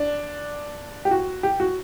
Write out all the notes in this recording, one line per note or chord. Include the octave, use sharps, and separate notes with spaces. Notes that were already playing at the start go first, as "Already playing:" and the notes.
Already playing: D4
G4
F#4
G4
F#4